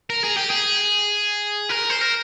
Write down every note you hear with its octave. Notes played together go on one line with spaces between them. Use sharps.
A#4
G#4
G4
G#4
A#4
C5
A#4